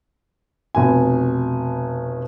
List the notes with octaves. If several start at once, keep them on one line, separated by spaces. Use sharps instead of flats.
F1 B2 G#5